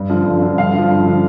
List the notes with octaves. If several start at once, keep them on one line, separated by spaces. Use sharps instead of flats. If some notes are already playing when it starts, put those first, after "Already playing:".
Already playing: G2
D3 F3
G2
D3 F3
G2 F5
D3 F3
G2
D3 F3